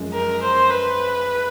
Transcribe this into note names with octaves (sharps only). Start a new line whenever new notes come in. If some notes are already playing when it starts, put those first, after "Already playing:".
Already playing: F#2 F3 G#3
A#4
C5
B4